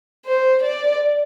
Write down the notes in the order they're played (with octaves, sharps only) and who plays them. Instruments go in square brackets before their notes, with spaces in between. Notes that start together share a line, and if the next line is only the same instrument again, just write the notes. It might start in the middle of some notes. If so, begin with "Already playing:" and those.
[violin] C5
D5